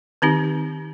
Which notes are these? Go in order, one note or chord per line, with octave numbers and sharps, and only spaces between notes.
D#3 C4 D#4 G4